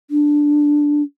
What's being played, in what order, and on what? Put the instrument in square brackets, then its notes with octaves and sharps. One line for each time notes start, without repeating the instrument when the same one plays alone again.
[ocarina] D4